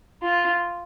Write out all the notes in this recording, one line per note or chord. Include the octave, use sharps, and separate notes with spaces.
F4